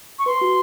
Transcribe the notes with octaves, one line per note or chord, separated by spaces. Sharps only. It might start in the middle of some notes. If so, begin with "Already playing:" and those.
C#6
B4 C6
F#4